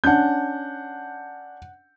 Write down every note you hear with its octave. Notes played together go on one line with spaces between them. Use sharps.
C#4 D4 F#5 G6